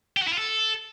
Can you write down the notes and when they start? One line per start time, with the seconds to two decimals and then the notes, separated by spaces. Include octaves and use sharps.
0.17 G4
0.22 F#4
0.27 E4
0.33 F4
0.38 A4